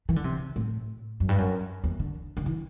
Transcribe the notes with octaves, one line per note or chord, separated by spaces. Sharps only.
E3
D3
C3
A2
F#2
G2
F#2
E2
D3
D3
E3